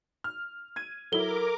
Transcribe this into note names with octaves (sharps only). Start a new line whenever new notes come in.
F6
G#6 D#7
F#3 E4 A4 A#4 D6 G7